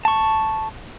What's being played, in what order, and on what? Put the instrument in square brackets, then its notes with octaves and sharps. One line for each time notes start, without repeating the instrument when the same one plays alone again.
[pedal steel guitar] A5 C#6